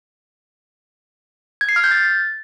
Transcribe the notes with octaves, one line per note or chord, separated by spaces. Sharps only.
G#6
C7
F6
G6
A6